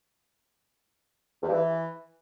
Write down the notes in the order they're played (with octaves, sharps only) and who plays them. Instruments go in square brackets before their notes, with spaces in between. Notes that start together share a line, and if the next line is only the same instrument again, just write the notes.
[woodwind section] E2
G2
E3